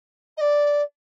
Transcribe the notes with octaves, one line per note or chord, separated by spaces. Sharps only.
D#5
D5